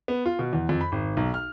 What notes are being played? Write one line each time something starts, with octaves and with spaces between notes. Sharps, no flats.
B3
F4
B2
E2
F2
B5
G#1
B1
F6